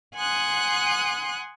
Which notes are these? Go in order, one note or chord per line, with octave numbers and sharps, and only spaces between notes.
F#5 G#5 C6 D#6 F#6